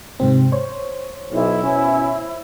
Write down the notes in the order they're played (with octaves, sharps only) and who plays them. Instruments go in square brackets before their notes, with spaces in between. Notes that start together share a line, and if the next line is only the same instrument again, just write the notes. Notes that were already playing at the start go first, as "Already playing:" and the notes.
[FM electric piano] G#2 C3 C4
C5 C#5
[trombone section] B1 [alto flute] E4
[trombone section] B2 C#4